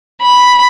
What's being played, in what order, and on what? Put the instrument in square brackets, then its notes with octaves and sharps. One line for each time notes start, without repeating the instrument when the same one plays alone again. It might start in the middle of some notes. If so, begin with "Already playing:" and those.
[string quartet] B5